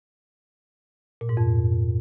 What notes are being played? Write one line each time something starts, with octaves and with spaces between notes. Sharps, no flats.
A#2
G#2
F2